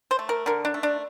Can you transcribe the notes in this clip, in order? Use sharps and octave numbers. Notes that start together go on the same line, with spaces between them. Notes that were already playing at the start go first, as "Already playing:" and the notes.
C5
A3
A#4
D3 A#4
D4
A3
D4